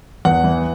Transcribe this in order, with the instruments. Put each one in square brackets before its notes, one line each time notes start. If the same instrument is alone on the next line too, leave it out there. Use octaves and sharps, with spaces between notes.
[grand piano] E2 F#5
E3